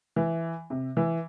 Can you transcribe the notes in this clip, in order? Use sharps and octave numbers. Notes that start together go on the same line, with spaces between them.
E3
C3
E3